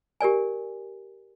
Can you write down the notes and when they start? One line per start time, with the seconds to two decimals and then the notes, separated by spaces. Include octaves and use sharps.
0.21 G4 A#4 D5 G#5